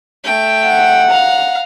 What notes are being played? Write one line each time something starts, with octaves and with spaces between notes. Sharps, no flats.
A3 G5
F#5
F5 A#5